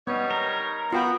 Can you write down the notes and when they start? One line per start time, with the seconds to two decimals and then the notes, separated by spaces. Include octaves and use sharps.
0.07 G3 B3 D#4 C#5
0.31 A#4
0.93 B3 F4 F#4 G5 B5